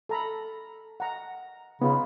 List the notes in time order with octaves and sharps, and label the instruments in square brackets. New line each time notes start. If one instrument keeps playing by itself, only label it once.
[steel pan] A4 A#5 B5
F#5 A#5
[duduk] C#3 [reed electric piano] B3 [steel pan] D#4 F4 [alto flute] B5